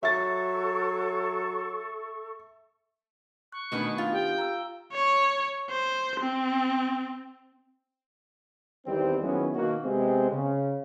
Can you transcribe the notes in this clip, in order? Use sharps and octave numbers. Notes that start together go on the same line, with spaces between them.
F#3 A4 E5 C#6 A6
C#6 F#6
B2 D#3 A3 B3 D4
F4
G4 G5
A#5 E6
C#5
C5
C4
E2 D#3 G3 C4
D#3 F#3 B3 C#4 E4 G#4
B2 D#3 A#3 F#4
C3 G#3 B3 C4
C#3